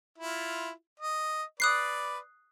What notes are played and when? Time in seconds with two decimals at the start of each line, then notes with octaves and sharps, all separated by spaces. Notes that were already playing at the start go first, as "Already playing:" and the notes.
0.18 E4 F4
1.00 D#5
1.60 B4 D5 D#6 F#6 C7